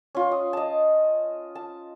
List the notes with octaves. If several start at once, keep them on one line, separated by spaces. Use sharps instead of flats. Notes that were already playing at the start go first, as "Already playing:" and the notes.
C#4 F4
D#6
D#5 A5
A5